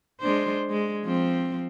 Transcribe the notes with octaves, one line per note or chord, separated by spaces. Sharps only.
G#3 D4 C5
G#3
F3 C4